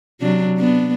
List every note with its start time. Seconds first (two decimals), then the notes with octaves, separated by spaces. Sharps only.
0.21 C3 F#3 D4
0.58 B3 D4